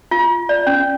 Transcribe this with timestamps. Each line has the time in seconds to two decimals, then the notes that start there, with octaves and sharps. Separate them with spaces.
0.11 F4
0.49 D5
0.67 C#4